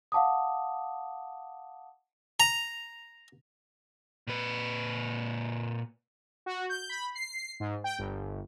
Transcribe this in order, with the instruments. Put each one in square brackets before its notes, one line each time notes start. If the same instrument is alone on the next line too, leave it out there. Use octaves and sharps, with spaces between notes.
[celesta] F5 F#5 A5 D6 D#6
[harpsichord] A#5
[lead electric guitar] A#2 B4
[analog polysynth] F#4
G6
B5
C7
G#2
G5
G1